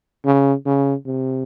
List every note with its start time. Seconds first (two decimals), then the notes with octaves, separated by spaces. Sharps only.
0.25 C#3
0.66 C#3
1.06 C3